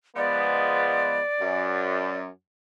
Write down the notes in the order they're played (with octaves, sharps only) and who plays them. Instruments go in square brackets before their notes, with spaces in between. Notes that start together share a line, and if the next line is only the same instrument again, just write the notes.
[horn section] F3 G#3 B3 [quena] D5
[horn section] F#2